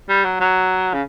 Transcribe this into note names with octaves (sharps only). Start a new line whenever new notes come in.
G3
F#3
F#3
C#3